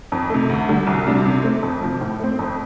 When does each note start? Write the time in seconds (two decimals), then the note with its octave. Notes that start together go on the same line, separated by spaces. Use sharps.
0.12 F2
0.30 C3 A3
0.50 D2
0.69 D3 G3
0.87 C2
1.06 C3 G3 D4
1.26 C3
1.44 A3 C4
1.63 F2
1.82 C3 F3
2.01 A2
2.19 A3 C4
2.39 F2